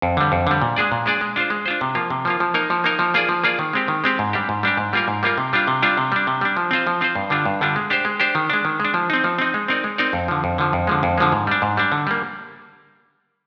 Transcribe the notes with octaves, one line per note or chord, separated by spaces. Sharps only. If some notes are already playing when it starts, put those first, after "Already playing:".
F2
D3 G3
F2
D3 G3
A#2
G#3 D4 G#4 D5
A#2
G#3 D4 G#4 D5
G#3
D4 F4 C5
G#3
D4 F4 C5
C3
F3 A#3 F4
C3
F3 A#3 F4
F3
A#3 D#4 A#4
F3
A#3 D#4 A#4
F3
A#3 F4 G#4 D5
F3
A#3 F4 G#4 D5
D#3
G#3 C4 G4
D#3
G#3 C4 G4
G#2
G3 D4 G4
G#2
G3 D4 G4
G#2
G3 A#3 F4 A#4
G#2
G3 A#3 F4 A#4
C3
G3 D4 F4
C3
G3 D4 F4
C3
G3 D4
C3
G3 D4
F3
C4 F4 C5
F3
C4 F4 C5
G2
D3 G3 D4 F4
G2
D3 G3 D4 F4
G#3
D4 G4 C5
G#3
D4 G4 C5
D#3
G#3 D4
D#3
G#3 D4
F3
C4 D#4
F3
C4 D#4
G#3
C4 D#4 A#4 D5
G#3
C4 D#4 A#4 D5
F2
D3 F3
F2
D3 F3
F2
D3 F3 G#3
F2
D3 F3 G#3
G#2
G3 D4
G#2
G3 D4
D3
G3 A#3